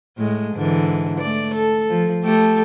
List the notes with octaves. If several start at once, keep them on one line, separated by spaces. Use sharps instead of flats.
A2 G#3
G#2 D3 E3
A3 D5
A4
F3
A3 G4 A4